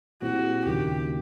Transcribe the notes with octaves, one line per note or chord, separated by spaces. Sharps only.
A#2 G3 C4 E4 F#4 G#4
D#2 C#3 F#3 A#3 D#4 G4